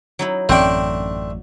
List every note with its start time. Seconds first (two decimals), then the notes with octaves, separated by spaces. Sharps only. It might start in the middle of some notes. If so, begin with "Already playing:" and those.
0.19 F#3 D#4 E4
0.49 A1 F#2 A3 C4 D4 G5